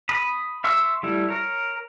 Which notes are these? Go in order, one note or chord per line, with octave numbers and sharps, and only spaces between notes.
B5 D#6
E5 C6 C#6 E6
G3 A3 E4
A#4 C#5